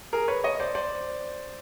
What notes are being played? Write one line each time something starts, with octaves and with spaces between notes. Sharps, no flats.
G#4 A#4
B4 C#5
C#5 D#5
C5 D5
C5 D5